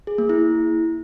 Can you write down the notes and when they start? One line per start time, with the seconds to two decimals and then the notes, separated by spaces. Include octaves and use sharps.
0.07 G#4
0.18 A#3
0.29 E4